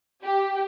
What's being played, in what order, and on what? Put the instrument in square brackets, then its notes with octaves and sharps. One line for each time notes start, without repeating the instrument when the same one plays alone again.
[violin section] G4